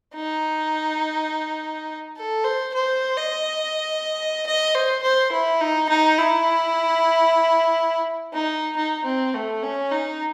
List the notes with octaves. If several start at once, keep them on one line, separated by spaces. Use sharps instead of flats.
D#4
A4
C5
C5
D#5
D#5
C5
C5
E4
D#4
D#4
E4
D#4
D#4
C4
A3
C#4
D#4